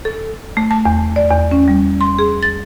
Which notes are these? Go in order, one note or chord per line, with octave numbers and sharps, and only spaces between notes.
A4
A3
A5
E2
D5
E2
C#4
G3
C6
G#4
A6